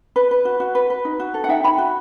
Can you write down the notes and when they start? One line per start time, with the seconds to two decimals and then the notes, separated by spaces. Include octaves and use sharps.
0.16 B4
0.31 B4
0.45 F#4
0.60 F#4
0.75 B4
0.90 B4
1.05 D#4
1.20 F#4
1.34 A4
1.44 F#5
1.49 D#4 E5 G5
1.64 D#4 G5 B5
1.78 F#4